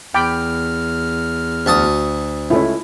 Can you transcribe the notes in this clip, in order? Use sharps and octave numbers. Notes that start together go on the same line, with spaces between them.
E2 G5 B5 D6 F6
D2 F#4 A5 D#6
C#2 A3 C#4 E4